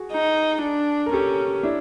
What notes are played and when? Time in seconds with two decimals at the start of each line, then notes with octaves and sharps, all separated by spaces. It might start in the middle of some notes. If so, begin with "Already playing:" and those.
Already playing: F#4 G#4
0.12 D#4
0.62 D4
1.06 A#4
1.13 C#4 G4 A4
1.63 D4 E4